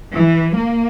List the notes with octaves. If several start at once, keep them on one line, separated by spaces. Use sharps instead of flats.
E3
A#3